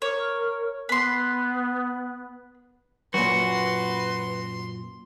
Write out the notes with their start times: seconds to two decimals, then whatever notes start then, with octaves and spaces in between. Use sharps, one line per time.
0.02 A#4 C#5
0.89 B3 B4 C6
3.14 F#2 A#2 F#4 B4 C6